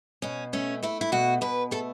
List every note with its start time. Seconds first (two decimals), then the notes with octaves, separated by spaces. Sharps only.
0.22 B2 C#4
0.53 A3 C#4
0.83 A3 E4
1.01 E4
1.12 B2 F#4
1.41 B2 B4
1.71 A3 A4